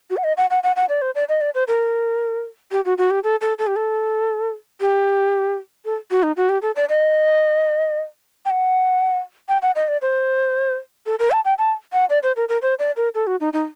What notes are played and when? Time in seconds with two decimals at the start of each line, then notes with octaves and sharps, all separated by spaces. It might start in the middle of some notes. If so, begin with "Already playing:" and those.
0.10 F#4
0.17 F#5
0.24 D#5
0.37 F#5
0.50 F#5
0.63 F#5
0.76 F#5
0.89 D5
1.02 C5
1.15 D5
1.29 D#5
1.41 D5
1.55 C5
1.68 A#4
2.71 G4
2.85 F#4
2.98 F#4
3.10 G4
3.24 A4
3.41 A4
3.59 A4
3.67 G4
3.76 A4
4.80 G4
5.85 A4
6.11 F#4
6.23 D#4
6.37 F#4
6.49 G4
6.62 A4
6.76 D5
6.89 D#5
8.45 G5
8.50 F#5
9.49 G5
9.62 F#5
9.75 D#5
9.88 D5
10.02 C5
11.06 A4
11.19 A#4
11.31 A5
11.45 G5
11.58 A5
11.93 F#5
12.10 D5
12.23 C5
12.36 A#4
12.49 A#4
12.62 C5
12.79 D5
12.96 A#4
13.15 A4
13.27 F#4
13.40 D#4
13.53 D#4